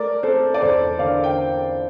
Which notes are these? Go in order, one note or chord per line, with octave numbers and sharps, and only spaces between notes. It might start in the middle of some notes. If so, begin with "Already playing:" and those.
Already playing: A3 A#4 D5
C4 A4 C5
D5
E2 A4 C5
D3 D5 F5
G5